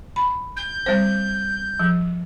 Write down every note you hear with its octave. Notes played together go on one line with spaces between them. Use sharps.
B5
G6
G3 C4 C5
F3